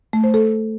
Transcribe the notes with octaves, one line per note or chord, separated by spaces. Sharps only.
A3
C5
A4